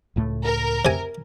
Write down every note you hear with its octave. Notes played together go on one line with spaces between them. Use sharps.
C#2 A2 A3
A#4
C3 G#5